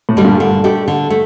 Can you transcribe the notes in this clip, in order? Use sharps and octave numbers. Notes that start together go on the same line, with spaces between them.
A2
D3 G3
G2 A#2
D3
A3 D4 G4
D3
A3